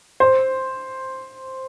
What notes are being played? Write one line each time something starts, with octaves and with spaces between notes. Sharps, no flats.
C5